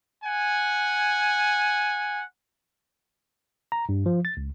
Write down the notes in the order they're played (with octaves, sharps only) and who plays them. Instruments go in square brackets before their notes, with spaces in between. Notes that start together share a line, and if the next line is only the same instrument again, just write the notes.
[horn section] F#5 G#5
[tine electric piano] A#5
G2
F3
A6
C#2